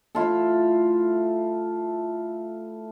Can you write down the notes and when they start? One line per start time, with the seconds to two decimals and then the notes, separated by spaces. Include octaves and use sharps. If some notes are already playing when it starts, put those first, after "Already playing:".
0.15 A3 E4 F4 A4